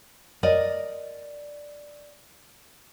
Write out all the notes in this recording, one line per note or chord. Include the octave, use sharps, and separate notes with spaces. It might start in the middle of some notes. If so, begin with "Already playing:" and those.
A#4 D5 D#5